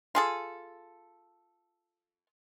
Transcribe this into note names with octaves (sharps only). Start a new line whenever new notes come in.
F4 G#4 A4